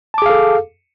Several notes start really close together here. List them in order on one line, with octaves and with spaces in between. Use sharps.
A5 D6 G#4 F5 A4